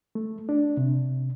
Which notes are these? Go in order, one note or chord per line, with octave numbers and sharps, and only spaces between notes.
A3
D4
C3